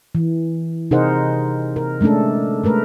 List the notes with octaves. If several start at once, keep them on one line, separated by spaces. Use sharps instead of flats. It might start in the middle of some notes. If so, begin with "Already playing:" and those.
E3
C3 D#4 G#4 A#4 C5 F#5
A#4
G#3 A3 C#4 D4 A4
G#3 A3 A#4 B4